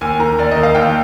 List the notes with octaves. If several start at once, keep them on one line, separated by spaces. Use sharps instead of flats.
D#2 G#5
D#3 A#5
D#2 D5
D#3 D#5
F5
D#2 G5